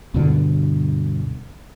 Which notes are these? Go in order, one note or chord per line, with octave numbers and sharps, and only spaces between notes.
D2 G2 B2 D3